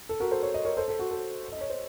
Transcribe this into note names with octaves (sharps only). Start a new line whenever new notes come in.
A4
F#4 A#4
A4 C5
C#5
D#5
A#4 C#5
A4 C5
A4
F#4
A4
D#5
C#5
C5